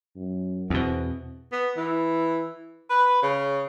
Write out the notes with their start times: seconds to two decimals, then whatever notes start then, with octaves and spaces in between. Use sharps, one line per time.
0.16 F#2
0.70 E2 B2 C4
1.52 B3
1.77 E3
2.90 B4
3.23 C#3